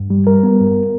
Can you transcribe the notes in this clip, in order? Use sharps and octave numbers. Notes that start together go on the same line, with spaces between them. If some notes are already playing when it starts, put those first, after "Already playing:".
Already playing: G2
G3
G3 A#4
B3
G2